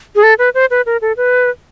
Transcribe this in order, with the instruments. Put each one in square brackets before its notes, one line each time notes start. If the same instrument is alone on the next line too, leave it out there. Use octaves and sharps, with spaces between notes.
[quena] G#4
A4
B4
C5
B4
A#4
A4
B4